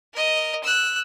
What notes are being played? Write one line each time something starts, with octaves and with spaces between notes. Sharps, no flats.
A#4 D#5
E6 F#6